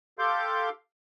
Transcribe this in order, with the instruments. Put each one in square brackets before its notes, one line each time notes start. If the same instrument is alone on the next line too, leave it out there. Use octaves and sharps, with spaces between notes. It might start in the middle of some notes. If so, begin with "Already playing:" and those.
[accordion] G4 A4 F5 C6 D6 G6